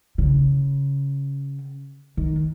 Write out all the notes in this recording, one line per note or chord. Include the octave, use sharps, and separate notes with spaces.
C#3
D#3